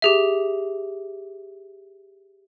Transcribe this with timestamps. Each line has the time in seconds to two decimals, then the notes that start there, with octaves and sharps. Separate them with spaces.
0.02 G4 G#4 E5